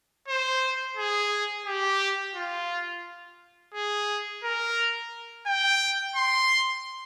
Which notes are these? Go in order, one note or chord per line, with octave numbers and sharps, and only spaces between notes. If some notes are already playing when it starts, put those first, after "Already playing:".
C5
G#4
G4
F4
G#4
A#4
G5
C6